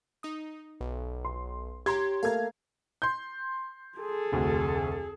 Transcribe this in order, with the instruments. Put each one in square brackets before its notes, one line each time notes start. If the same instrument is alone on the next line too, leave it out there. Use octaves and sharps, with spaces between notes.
[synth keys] D#4 D#6
B1
[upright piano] C6
[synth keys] G4 C#5 [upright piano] A#5 C6 G#6
[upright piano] A3 A#3 G#6 [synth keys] F5 A#5
[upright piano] C6 G6
[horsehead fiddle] G#4 A4
[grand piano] F1 D2 F#4